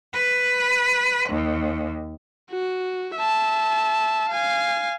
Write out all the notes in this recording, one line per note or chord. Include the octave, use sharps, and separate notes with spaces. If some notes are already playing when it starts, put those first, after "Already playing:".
B4
D#2
F#4
E5 A5
F5 G#5